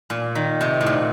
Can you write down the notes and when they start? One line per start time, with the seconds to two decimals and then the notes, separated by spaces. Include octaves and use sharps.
0.10 A#2
0.35 D#3
0.61 C3
0.81 A2
0.86 A#2